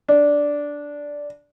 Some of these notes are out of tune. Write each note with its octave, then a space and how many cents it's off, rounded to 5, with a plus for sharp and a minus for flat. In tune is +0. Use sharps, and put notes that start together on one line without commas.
D4 -5